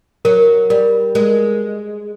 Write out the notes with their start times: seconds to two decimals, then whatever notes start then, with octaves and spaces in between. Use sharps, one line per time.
0.25 F#3 A#4
0.70 G3 A#4
1.15 G#3 A#4